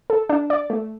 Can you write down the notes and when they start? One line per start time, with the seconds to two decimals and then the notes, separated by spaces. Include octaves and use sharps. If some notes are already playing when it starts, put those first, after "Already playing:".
0.10 A4
0.29 D4
0.50 D5
0.70 A3